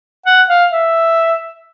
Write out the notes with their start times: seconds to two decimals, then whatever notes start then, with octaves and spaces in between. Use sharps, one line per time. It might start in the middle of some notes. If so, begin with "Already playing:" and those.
0.26 F#5
0.49 F5
0.72 E5